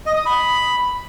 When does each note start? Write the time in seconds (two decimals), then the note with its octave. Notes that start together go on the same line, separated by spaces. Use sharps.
0.06 D#5
0.16 D#6
0.26 B5